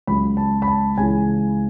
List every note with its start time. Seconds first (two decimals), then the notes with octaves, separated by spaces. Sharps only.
0.07 C#2 C#3 F#3 B5
0.37 A5
0.62 B5
0.68 A5
0.98 C#2 C#3 E3 G#5